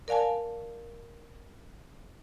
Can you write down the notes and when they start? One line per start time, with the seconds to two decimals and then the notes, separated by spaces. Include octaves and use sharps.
0.08 A#4 D5 F5 G#5 A5